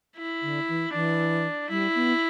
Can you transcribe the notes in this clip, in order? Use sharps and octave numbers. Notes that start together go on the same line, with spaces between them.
E4
D3
E3
E3 D4
G3 E4
B3